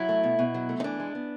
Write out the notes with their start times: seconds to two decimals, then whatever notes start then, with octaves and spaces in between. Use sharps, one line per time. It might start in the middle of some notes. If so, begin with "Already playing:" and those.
Already playing: F#3 E4
0.09 A3
0.24 B2
0.39 B2
0.54 F#3
0.69 A3
0.80 D#4
0.84 E3 D4
1.00 G#3
1.15 B3